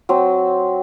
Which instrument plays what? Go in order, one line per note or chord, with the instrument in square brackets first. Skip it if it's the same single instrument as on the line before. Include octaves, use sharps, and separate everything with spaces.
[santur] F#3 C4